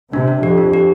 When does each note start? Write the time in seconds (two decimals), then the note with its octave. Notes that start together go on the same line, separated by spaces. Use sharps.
0.13 C3 D4
0.28 D4
0.43 F2 G4
0.58 D4
0.73 G4